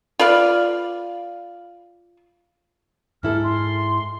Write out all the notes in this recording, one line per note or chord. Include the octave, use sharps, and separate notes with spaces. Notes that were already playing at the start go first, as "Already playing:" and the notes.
F4 B4 D5 F5
G#2 E4 A4 F6
C6